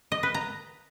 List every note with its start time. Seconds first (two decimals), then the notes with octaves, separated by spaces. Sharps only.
0.12 D#5
0.23 B4
0.34 A#5